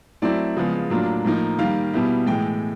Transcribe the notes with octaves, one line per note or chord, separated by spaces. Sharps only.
F#3 A3 C4 E4 D5
C#3 F3 G#3 B3
A2 F#3 A#3 D4 F4
A2 F3 A#3 D#4
D#3 G3 A#3 F5
B2 G3 B3 E4
A2 E3 G#3 G5